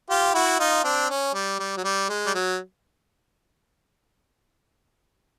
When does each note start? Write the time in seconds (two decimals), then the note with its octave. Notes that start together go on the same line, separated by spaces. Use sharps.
0.10 F4 G4
0.34 E4 F#4
0.60 D#4 F4
0.84 C4 D4
1.10 C#4
1.34 G3
1.59 G3
1.77 F#3
1.84 G3
2.09 G#3
2.26 G3
2.35 F#3